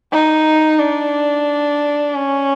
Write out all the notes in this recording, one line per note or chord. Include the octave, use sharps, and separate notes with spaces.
D#4
D4
C#4